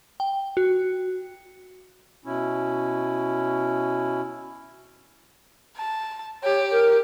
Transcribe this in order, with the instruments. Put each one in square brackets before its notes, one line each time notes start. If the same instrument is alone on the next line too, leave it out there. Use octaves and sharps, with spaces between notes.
[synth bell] G5
F#4
[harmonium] B2 C#4 E4
[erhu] A5
[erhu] G4 [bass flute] C#5
[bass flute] A#4